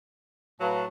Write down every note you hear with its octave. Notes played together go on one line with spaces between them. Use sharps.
A2 F#3 B4 F5 A5